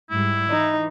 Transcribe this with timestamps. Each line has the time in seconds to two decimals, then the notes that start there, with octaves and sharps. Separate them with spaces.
0.11 G#2 G3 E4
0.50 E3 D#4